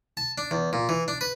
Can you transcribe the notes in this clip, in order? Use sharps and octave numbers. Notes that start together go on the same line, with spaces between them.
A5
D4
E2
A#2
E3
D4
B4